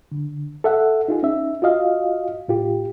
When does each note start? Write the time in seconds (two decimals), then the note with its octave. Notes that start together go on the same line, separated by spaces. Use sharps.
0.12 D3
0.64 A4 E5 F#5
1.08 D#4 F4 G#4
1.23 C#4 D#4 E5
1.62 F4 F#4 D#5 F5
2.48 A2 F4 G4